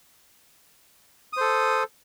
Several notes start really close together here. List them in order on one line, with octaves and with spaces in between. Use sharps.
D#6 C5 A4